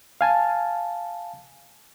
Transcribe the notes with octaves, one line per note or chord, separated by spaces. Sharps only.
F5 G#5 A5